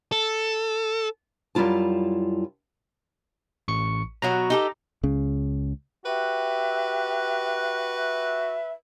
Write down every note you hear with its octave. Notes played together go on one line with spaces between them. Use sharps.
A4
F#2 G3 E4 F4 A5
A1 C#6 C#7
B2 F#3 F#4 A#5
D#4 G4 A4
C#2 C#3
F#4 G4 B4 E5
E5